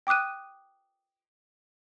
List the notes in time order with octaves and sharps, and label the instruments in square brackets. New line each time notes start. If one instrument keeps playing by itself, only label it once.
[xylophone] G5 D6 D#6 F#6 D#7